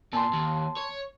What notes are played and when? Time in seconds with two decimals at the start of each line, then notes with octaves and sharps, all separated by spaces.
0.13 A#2 A5 C6
0.33 D#2
0.77 C#5